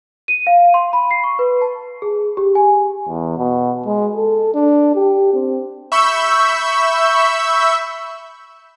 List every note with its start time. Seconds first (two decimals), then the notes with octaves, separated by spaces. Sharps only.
0.28 D#7
0.47 F5
0.74 C6
0.93 B5
1.11 C7
1.24 C#6
1.39 B4
1.62 A5
2.02 G#4
2.37 G4
2.55 G#5
3.08 E2
3.38 B2
3.87 G#3
4.15 A4
4.54 D4
4.96 G4
5.34 C4
5.92 E5 B5 C#6 E6 G6